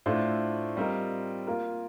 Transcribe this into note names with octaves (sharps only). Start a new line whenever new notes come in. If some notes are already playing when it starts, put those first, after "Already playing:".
A2 A3 D4 F4 C5
G3 C4 F4 A#4 D#5
A#3 F4 A#4